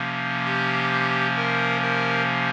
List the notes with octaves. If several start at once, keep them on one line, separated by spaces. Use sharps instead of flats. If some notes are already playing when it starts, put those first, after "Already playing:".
Already playing: C3 F3 A#3 C#4
G4
A#4
A#4